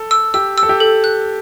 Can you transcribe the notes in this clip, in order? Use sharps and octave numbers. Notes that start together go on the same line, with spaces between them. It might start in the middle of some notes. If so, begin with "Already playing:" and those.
Already playing: A4
E6
G4 E6
E6
A4
G4
A4
F#6